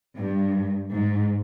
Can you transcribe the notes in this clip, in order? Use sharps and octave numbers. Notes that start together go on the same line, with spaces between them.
G2
G#2